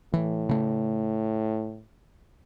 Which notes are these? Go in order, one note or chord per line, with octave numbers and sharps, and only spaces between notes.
A2 E3
C#3 A3